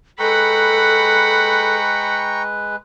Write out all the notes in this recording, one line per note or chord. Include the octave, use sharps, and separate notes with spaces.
G#3 A4 B4 F#5 G5 A#5 B5 C#6